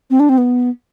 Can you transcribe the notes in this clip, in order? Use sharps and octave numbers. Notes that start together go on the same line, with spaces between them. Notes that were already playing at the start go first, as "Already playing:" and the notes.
C4
D4
C4
B3